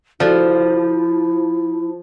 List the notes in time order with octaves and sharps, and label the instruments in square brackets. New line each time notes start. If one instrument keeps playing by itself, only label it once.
[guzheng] F3 [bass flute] E4 [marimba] F#4 A4 D5